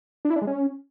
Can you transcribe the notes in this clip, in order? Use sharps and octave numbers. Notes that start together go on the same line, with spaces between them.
D4
E4
D4
G#3
C#4